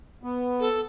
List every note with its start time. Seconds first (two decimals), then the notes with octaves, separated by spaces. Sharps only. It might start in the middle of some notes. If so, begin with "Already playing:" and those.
0.23 B3
0.60 A4